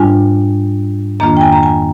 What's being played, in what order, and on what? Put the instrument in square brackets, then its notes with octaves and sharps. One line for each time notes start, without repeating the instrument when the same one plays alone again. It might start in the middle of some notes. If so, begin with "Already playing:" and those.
Already playing: [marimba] G#2 G3 D4 F4 G#5
F2 D#3 A#3 D4 F4 A#5
G5
G#5
A#5
G#5